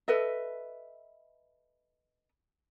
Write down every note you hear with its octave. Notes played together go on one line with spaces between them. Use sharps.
A4 B4 D#5 E5